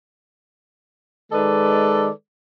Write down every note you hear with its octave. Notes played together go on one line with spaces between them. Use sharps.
D#3 G#3 A4 B4 D5